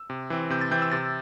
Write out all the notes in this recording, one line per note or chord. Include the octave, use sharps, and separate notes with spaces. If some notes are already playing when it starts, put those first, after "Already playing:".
Already playing: E6
C3
E3 C4
C3 G6
A6
E3 C4 G6
E6
C3 A6